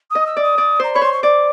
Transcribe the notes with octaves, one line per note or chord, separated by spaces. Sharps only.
D#5 D#6
E6
D5
D#6
D5
C5 A#5
C#5 B5
C5 C6
C#6
D5 D6